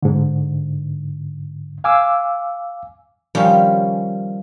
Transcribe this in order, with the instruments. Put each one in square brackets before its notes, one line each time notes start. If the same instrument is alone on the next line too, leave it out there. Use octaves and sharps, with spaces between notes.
[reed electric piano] G#2 D3
F5 G#5 D6 E6
[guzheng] D#3 F3 G3 C#4